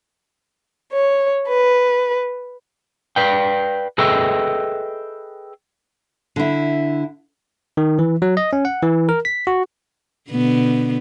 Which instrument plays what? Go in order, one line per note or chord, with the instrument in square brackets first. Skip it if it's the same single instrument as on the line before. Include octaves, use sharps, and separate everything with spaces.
[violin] C#5
B4
[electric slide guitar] B4 D5 F5 G5
G#4 A4 B4 D#5 E5 G5
[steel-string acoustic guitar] D3 E4
[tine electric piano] D#3
E3
F#3
D#5
C#4
F#5
E3
A#4
B6
F#4
[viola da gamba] B2 D3 B3